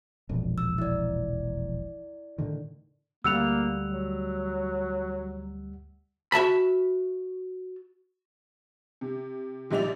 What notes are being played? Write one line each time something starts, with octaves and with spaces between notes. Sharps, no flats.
E1 A#1 F2
E6
E4 D5
A2 D3 D#3
D2 G3 A#3 F#5 E6 F7
F#3
F#4 E5 A5 B5
C3
A#1 G3 D#4 D5 E5 F7